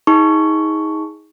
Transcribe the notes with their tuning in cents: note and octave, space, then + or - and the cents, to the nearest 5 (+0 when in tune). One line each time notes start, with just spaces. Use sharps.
D#4 +35 G#4 +0 C#6 +5